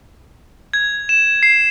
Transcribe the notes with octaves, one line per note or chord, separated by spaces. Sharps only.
G#6
E7
C7